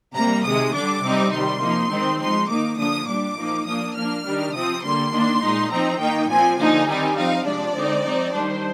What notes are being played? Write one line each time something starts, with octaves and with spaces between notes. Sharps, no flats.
C3 G3 A#3 A#5
C3 D#3 G#3 D#6
D3 G3 D4 D6
C3 G3 C4 D#4
C3 D#3 G3 C6
F3 A#3 D#4
D#3 G#3 C4 D#4
F3 G#3 D#4 C6
D#3 A#3 D#4 D6
D3 F3 A#3 D4 D#6
A#2 G3 D4 D6
F3 A#3 D#4
F3 A#3 D4 D#6
F3 A#3 D4 F6
D#3 G3 D4
C3 F3 C4 D#6
D3 G3 A#3 C6
D#3 A#3 D4
A#2 G#3 D#4
F3 C4 D#4 A#5
D#3 A#3 D#4 G5
A#2 F3 C4 G#5
D3 F3 A#3 D#4 G#5
D#3 G3 C4 D#4
F3 C4 D#4 F5
C3 F3 G#3 D4 D5
D3 G#3 C4 D#4
F3 C4 D#4
D#3 G3 D4 C5